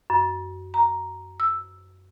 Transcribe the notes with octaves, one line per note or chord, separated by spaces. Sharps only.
F#2
A#5
E6